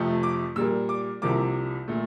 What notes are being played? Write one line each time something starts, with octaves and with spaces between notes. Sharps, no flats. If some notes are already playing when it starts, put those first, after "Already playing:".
Already playing: F2 C3 F3 A3
D6
A#2 G3 A#3 E6
D6
C2 C3 F3 A#3 D6
A#2 A3